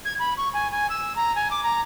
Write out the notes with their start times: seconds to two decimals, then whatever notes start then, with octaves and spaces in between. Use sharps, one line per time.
0.05 G#6
0.19 B5
0.37 C#6
0.54 G#5
0.72 G#5
0.90 E6
1.16 A#5
1.36 G#5
1.51 D6
1.63 A#5